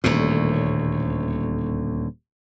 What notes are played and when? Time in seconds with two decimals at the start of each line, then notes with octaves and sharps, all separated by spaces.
0.04 D#1 D2 A2